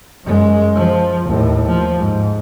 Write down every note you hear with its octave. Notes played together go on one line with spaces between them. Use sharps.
F#2 G#3
F3
D#2 A2
F3
G#2